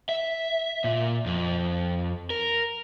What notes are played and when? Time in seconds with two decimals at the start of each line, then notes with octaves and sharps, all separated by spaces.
0.09 E5
0.84 A#2
1.26 F2
2.30 A#4